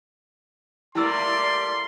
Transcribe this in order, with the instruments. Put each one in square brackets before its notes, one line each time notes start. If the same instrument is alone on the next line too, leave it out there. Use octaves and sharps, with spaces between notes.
[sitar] G3 A3 A#3 [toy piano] E4 E6 [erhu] D5 [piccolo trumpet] C6